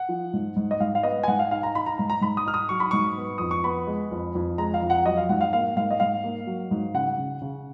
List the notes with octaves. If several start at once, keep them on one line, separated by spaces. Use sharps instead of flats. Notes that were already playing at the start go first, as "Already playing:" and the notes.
Already playing: F#5
F3
G#2
G#2
D#5
G#2 F5
F5
B3 D#5
G#5
G#2 F#5
F5
D#4 F5
A#5
D#4 B5
A#5
G#2 A#5
A#5
G#2 B5
D#6
D#4 F6
D#6
F#3 C#6
B5
G#2 C#6
B3
F2 D#6
C#6
B3 B5
G#3
F2
F2
G#3 A#5
F5
F2
F#5
F#3 D#5
F5
G#2 F#5
F5
A#3 F5
G#2 F5
D#5
G#2 F5
A#3
F#3
G#2
C#3 F#5
C#3
C#3